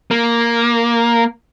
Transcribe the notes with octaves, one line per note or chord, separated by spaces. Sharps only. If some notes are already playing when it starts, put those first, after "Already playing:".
A#3